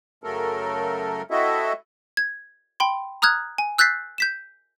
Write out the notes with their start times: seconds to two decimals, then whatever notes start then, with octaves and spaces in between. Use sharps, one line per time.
0.24 F#2 C#3 F#3 A3 A4 A#4
1.31 C4 E4 F#4 A4 D#5 E5
2.17 G#6
2.80 G5 B5 C6
3.22 A#5 D#6 F6 F#6 G#6
3.58 G#5
3.78 E6 F#6 G6 A6 B6 C7
4.18 G6 B6 E7